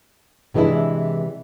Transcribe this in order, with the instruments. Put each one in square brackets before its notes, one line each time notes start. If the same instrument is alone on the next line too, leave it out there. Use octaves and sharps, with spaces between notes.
[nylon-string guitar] C3 E3 G#3 D4 E4